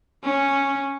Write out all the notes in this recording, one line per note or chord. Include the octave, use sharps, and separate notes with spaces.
C#4